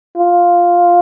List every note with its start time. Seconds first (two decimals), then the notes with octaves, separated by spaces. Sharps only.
0.18 F4